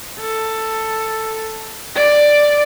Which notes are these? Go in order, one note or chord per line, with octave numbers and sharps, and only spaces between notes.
A4
D5